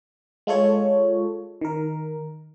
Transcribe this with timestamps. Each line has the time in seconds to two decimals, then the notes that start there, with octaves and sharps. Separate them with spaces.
0.47 G#3 F4 A4 C#5
1.61 D#3 A#4